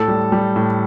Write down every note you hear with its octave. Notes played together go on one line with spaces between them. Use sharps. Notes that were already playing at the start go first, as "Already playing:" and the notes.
Already playing: A2 A4
G3
G3
A2